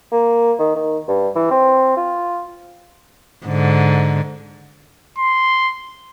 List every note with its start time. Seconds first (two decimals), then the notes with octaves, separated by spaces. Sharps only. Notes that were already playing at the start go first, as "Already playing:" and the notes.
0.12 A#3
0.59 D#3
0.76 D#3
1.08 G2
1.35 E3
1.51 C4
1.97 F4
3.46 G#2 D3
5.18 C6